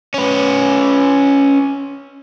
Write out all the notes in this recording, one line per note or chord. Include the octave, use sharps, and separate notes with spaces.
C#4 B4